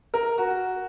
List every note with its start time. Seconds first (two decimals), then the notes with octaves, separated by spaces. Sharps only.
0.14 A#4
0.38 F#4